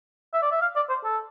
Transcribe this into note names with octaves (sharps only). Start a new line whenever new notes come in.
E5
D5
E5
F5
D5
C5
A4